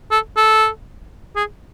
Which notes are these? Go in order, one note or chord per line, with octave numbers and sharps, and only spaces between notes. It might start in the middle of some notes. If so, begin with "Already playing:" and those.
A4
A4
G#4